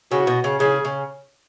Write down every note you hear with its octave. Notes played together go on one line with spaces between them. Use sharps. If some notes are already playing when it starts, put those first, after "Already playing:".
C#3 F#4
B2
C#3
C#3 G#4
C#3